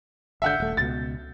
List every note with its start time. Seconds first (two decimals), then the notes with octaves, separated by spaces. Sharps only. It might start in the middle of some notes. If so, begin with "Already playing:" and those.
0.42 G#1 D3 E5 F#5 G6
0.60 D#1 A3
0.77 C#2 B2 A6